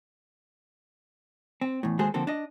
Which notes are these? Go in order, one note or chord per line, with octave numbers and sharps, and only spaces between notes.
C4
E2 A2
D#2 G#3 F#4 G#4 A4 C5
D3 F3 A#3 C4 A4
D4 D#5